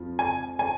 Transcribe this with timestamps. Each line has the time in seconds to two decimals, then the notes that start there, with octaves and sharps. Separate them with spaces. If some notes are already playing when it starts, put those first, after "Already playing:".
Already playing: F2 F3
0.19 G#5
0.59 G#5